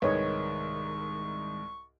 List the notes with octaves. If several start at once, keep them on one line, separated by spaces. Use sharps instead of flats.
C2 G#2 D#3 G#3 B4 C#5 D#5 C#6